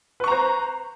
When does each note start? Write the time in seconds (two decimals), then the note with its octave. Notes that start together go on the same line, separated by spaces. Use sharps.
0.20 B4
0.24 C#6
0.28 A#5
0.32 C5